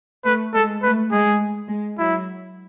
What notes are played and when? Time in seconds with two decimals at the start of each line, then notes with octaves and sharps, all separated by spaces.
0.25 A3 B4
0.53 G#3 A4
0.83 A3 B4
1.12 G#3 G#4
1.69 G#3
1.98 F#3 E4